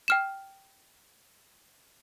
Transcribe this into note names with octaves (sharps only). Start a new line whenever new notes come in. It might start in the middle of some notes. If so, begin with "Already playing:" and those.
G5 F6 E7